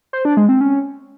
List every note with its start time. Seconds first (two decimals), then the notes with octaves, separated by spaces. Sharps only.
0.13 C5
0.25 D4
0.37 G#3
0.49 C4
0.61 C#4